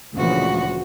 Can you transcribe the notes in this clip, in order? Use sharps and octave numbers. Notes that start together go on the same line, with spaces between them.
D2 A#2 C#3 E3 F3 F#4